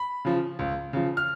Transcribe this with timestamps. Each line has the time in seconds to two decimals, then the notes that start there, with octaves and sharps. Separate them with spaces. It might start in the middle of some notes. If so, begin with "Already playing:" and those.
Already playing: B5
0.25 C#3 F3
0.59 C#2
0.93 C#3 F3
1.17 F6